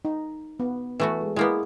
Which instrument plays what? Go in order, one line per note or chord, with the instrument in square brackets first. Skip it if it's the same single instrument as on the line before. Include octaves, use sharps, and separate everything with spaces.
[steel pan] D#4
B3
[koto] E3 A3 F#4
[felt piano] G#3
[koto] G#3 A#3 B3 [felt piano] E4 G#4